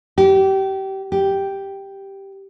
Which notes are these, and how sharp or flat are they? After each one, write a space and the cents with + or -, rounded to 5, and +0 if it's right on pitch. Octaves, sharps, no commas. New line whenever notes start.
G4 -25
G4 +0